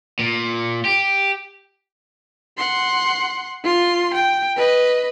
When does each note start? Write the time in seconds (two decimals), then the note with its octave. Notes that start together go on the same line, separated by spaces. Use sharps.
0.19 A#2
0.85 G4
2.57 F#5 C6
3.63 F4 C6
4.14 G5
4.57 B4 D#5